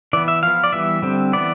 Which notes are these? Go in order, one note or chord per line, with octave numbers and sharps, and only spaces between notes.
E3 B3 D5
E5
F3 B3 F5
D5
E3 G3 B3 E5
D3 G3 C4
E3 B3 D5